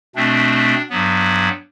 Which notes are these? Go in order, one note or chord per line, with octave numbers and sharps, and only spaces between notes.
B2 A3 C4 D4
G2 F#3 B3